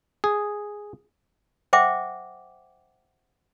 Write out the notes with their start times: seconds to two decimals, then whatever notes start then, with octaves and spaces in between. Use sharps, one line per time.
0.24 G#4
1.73 C5 E5 F#5 G5 D6